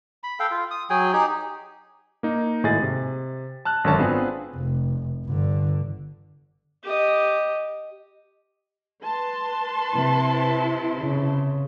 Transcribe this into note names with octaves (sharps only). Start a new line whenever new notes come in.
B5
A4 F5 G5
F4
D#6
F#3 G#4 G5 G#5
D#4 G4 G#4
A#3 D#4
G#1 A2 G#4 D#5 A6
C3
A5 F6 F#6
G#1 F#2 D3 C#5 A5
B3 C4 D4 F4 G#4 B4
F1
G1 D3
G4 D#5
B4 A5 C6
C3 E4
C#3